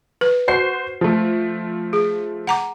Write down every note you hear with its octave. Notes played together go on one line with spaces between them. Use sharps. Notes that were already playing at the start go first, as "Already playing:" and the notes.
B4
F#4 C5 C7
F3 A3
G#4
F#5 A#5 D6